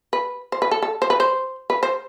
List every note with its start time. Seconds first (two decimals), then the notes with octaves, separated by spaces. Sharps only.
0.13 B4
0.52 C5
0.62 B4
0.71 A4
0.82 A4
1.02 C5
1.10 B4
1.20 C5
1.70 B4
1.83 C5